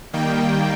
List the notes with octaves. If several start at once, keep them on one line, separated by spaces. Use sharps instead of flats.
D#3 G3 A#3 G5